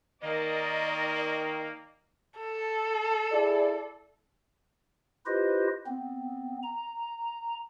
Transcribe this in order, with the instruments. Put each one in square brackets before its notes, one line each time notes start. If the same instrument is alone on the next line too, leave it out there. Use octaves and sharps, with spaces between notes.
[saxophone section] D#3 [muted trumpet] A#3 [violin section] D5 D#5
[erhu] A4
[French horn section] E4 G#4 D5
[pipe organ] E4 F4 G4 B4 C5 D#5
B3 C4
A#5